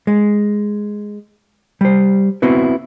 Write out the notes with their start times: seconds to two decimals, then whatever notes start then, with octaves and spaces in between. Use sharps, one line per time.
0.07 G#3
1.81 G3 C5
2.42 B3 C4 E4 F#4 B4